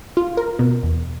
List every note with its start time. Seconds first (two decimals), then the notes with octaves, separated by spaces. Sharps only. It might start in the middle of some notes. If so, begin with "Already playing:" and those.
0.17 F4
0.37 A#4
0.59 B2
0.83 E2